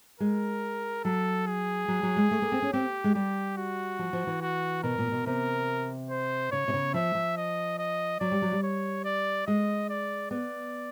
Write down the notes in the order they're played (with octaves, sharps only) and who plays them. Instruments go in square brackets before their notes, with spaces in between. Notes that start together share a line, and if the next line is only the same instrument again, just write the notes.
[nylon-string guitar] G#3 [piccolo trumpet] A#4
[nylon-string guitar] F#3 [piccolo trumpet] A4
[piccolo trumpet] G#4
[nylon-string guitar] F#3
F#3
G#3
A3
A#3
C4
C#4
[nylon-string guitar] C4 [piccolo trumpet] G4
[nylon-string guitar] G#3
[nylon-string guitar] G3 [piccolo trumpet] G4
[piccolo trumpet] F#4
[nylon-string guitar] F3
F3
E3
[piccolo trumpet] F#4
[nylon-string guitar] B2 [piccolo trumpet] A#4
[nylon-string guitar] A#2
B2
[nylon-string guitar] C3 [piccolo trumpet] A#4
[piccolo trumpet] C5
[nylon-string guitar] C#3 [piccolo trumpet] C#5
[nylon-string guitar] C3
C#3
[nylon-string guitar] F3 [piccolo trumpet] E5
[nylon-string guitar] F3
[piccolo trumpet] D#5
D#5
[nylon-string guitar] F#3 [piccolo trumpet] D5
[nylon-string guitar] G3
F#3
G3
[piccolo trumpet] C#5
D5
[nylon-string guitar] G#3 [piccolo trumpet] D#5
[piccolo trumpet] D5
[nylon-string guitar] B3 [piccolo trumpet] D5